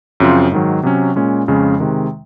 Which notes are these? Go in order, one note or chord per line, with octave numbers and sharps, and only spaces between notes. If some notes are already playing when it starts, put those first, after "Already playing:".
F#2 C#3 F3 C4 F4
G#2 D#3 F#3
C3 F#3 C#4
A#2 G#3 C#4
F2 C#3 G#3 C#4
C3 D#3 G#3